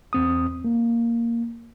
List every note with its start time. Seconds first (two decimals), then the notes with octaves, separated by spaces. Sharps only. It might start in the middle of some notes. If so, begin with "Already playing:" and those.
0.13 E2 C4 D#6
0.64 A#3